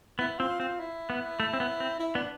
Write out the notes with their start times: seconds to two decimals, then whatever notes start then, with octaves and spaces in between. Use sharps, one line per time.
0.19 B3 E4
0.39 C4 F4
0.60 C4 F4
0.80 E4
1.10 B3
1.40 A3
1.53 C4
1.60 B3
1.80 C4
2.00 E4
2.15 B3 D4